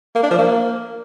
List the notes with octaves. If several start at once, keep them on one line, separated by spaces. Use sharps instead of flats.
A#3
D4
F3
A#3